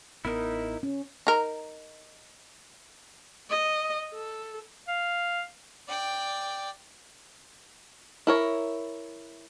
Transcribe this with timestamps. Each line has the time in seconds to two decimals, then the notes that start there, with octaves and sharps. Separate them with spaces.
0.25 A1 B3 D#4 E4 A#4
0.83 C#4
1.27 D#4 A#4
3.50 D#5
4.13 A4
4.88 F5
5.88 D5 G5
8.27 E4 A#4 C#5